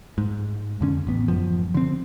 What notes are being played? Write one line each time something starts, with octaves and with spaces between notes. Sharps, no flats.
G#2
F2 D3 C#4
A1 B3
F#2 F3
D3 C4